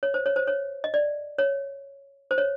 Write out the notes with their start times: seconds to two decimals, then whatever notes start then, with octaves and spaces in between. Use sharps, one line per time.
0.03 C#5
0.14 C5
0.26 C#5
0.36 C5
0.47 C#5
0.84 D#5
0.94 D5
1.38 C#5
2.31 C5
2.38 C#5